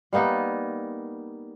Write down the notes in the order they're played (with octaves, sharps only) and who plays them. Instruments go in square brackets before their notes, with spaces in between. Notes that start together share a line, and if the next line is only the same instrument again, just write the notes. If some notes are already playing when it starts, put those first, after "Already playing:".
[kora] G3 A#3 B3 D#4